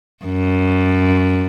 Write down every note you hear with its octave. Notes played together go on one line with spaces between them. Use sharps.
F#2